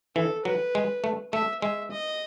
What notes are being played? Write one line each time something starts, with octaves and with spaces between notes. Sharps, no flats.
E3 A4
F#3 B4
G#3
A3
A3 E5
G#3 E5
D#5